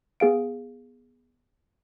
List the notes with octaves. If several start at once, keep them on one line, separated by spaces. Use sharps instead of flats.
B3 G#4 F5 D7